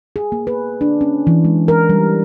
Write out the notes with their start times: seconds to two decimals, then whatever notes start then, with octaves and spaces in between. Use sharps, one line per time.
0.16 G#4
0.32 A#3
0.47 B4
0.81 D4
1.01 C#4
1.27 E3
1.45 G#3
1.68 A#4
1.89 G3